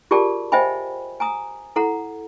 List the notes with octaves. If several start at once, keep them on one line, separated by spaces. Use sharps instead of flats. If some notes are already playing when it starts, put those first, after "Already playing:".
F4 G4 G#4 A#4 D5 A5
C5 D#5 E5 G5 G#5 B5
G#5 A#5 D#6
E4 A4 F#5 A#5